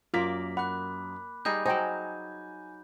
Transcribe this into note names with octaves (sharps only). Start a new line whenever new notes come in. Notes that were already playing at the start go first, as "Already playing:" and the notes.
F#2 A#3 F4 A#4 D5 B6
F#5 B5 D6 F#6
G3 D#4 G#4 G6
F#3 D#4 C5 G5 G#5